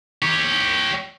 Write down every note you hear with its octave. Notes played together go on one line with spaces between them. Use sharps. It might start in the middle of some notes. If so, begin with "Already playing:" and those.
G4 C#5